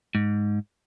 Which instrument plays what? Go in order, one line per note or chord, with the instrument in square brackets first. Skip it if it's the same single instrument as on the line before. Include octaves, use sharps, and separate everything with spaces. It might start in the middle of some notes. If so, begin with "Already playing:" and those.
[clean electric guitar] G#2